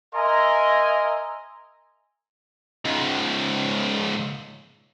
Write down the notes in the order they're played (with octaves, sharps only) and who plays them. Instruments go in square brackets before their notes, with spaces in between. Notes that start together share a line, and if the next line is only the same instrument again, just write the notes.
[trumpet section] A#4 D#5 E5 G#5 A#5 C6
[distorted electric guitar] C#2 G#2